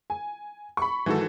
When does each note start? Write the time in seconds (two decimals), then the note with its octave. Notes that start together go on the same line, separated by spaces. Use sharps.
0.10 G#5
0.77 B5 C#6
1.06 G#1 G#2 E3 F#4 A4